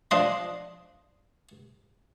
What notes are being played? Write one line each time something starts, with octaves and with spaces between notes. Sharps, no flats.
F3 D4 D#5 C6